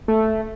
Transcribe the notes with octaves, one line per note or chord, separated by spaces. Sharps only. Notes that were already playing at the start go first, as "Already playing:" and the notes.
A3